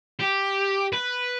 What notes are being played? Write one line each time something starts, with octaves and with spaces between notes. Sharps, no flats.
G4
B4